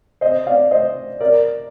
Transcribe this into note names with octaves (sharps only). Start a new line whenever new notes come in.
C5 D#5
D5 F5
C5 D#5
A#4 D5